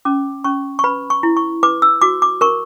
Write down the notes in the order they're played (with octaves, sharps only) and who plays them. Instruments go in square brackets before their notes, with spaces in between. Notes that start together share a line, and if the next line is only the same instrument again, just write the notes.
[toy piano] C#4 D6
C#4 C#6
C#6
B4 B5
C#6
E4
C#6
B4 D6
E6
F#4 D6
D6
A#4 C#6